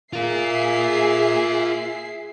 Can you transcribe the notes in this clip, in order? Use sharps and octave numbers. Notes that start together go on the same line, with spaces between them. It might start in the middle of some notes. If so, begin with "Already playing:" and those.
F4 G#4 A#4 E5 C7